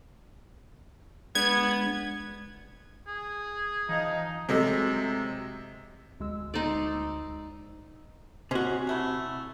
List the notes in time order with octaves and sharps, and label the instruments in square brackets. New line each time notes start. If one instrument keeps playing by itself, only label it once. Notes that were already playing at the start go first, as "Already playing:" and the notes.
[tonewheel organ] G#3 D4 [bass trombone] B3 [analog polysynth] G#6
[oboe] G#4
[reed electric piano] E3 [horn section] F3 D#4
[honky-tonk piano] C3 F#3 G#3 A3 C4
[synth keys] D2 G#3 E6
[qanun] D#4 C5 D5
[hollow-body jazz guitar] C3 F#4 [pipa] C#4 C5 D#5
[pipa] F#3 A3 E4